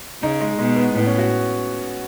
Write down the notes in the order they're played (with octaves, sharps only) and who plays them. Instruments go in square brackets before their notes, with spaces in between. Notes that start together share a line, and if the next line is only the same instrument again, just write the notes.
[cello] C#3 [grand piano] D#4
[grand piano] G#3
[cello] B2 [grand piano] G#3
[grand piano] B3
[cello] A2 [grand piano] B3
[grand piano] C#4
F#4